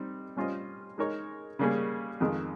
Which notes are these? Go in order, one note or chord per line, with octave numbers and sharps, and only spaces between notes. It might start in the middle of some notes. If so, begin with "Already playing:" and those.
Already playing: G3 C4 D#4
G3 C#4 F4 C5 D#5
G#3 D#4 A#4 C#5
C#3 G3 A#3 C#4 G#4
F2 D#3 G#3